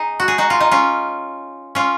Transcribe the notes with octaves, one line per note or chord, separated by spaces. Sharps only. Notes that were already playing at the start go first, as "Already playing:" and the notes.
Already playing: D#4 G#4
F#4
G#4
D#4 F#4
F4
D#4
C#4 F4
C#4 F4